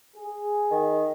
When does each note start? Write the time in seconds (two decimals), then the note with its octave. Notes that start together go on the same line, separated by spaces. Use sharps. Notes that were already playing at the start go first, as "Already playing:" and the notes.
0.17 G#4
0.71 D#3